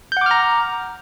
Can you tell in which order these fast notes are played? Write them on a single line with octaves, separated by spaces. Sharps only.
G6 F#5 D6 F6 A#5